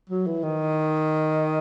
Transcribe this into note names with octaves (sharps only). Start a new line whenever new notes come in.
F#3
E3
D#3